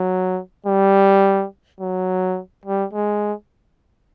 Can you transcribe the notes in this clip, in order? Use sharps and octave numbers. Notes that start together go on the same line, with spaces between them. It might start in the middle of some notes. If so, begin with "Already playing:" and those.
Already playing: F#3
G3
F#3
G3
G#3